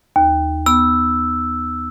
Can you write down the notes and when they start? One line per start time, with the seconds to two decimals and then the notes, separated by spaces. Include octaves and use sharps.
0.16 D#2
0.66 B3 E6